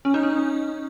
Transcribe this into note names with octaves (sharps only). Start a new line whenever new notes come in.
C#4
D#4
C#4